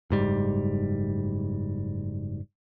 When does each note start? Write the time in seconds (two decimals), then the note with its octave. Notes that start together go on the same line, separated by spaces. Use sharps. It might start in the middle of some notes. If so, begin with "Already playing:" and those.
0.10 F#1 G#2 G3